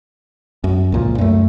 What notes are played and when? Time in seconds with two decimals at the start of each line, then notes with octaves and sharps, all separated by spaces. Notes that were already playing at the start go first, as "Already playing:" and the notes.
0.64 F#2
0.92 C#2 A#2 F3
1.18 F#2 A3